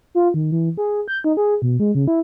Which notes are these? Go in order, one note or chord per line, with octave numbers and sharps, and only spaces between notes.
F4
D#3
E3
G#4
G6
D#4
G#4
B2
G#3
C#3
E4